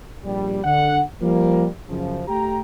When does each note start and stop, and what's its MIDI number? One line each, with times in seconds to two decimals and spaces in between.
0.24 0.60 34
0.24 0.60 55
0.64 1.01 50
0.64 1.01 78
1.22 1.67 53
1.22 1.67 55
1.22 1.67 58
1.88 2.22 42
1.88 2.22 49
1.88 2.22 53
2.28 2.59 57
2.28 2.59 67
2.28 2.59 79
2.28 2.59 82